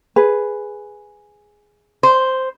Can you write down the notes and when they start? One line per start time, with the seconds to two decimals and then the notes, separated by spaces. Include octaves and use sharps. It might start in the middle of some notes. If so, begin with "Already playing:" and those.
0.16 G#4 B4
2.03 C5